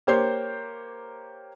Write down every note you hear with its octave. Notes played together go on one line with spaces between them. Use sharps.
A#3 G4 C5 C#5 G6 C7